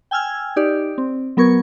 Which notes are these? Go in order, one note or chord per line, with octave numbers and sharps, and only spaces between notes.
G5 G#5 E6 F6 G#6
D#4 G4 D5
C4
F#3 B3 A#4 C#6 G#6